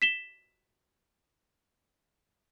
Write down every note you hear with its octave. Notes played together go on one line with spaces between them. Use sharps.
B6 E7 G7